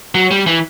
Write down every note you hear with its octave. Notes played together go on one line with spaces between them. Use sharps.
F#3
G3
E3